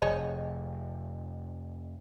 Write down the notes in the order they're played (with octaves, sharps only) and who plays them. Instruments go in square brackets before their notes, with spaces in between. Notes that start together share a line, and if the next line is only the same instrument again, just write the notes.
[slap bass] F1 [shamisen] G#4 C#5 D#5